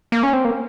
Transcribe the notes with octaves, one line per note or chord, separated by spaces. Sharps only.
A#3
C#4
C4
A#3